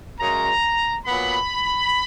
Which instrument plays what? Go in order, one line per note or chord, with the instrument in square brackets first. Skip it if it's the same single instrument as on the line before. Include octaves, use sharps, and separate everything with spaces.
[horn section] F#2 C#3 G#3 A#5
A#2 F#3 B3 B5